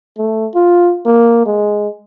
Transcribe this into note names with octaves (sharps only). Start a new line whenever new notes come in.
A3
F4
A#3
G#3